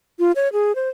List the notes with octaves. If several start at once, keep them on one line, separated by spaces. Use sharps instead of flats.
F4
C#5
G#4
C5